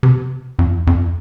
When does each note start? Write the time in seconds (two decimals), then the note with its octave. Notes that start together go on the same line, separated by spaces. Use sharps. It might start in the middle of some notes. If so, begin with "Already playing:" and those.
0.03 C3
0.59 F2
0.87 F2